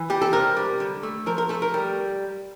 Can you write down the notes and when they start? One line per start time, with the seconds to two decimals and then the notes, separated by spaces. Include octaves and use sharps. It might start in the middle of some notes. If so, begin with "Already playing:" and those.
Already playing: E3
0.10 G3 G4
0.22 A4
0.33 C3 A#4
0.56 G3
0.80 D3
1.03 A3
1.26 F3 A#4
1.38 A#4
1.49 A3 A4
1.62 A#4
1.74 G3